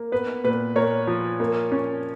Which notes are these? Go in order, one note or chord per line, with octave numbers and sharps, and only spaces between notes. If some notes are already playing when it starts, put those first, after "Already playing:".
Already playing: A#3
B3 B4
A#2 B4
A#2 A#4 C#5
F3
A#3
C#4